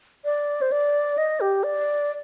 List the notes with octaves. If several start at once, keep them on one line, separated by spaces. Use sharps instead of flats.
D5
C5
D5
D#5
G4
D5